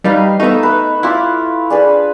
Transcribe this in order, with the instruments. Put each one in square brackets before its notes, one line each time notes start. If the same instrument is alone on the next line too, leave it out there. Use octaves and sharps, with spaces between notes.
[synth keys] G3 D#4 [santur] B4 F5
[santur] A3 E5 [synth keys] B3 D#4
[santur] B4
[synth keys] E4 [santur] F4 D6
[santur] D4 G#4 B4